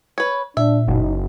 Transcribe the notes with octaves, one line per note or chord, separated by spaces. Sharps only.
B4 C#5
A#2 D4 E5
F#1 D#4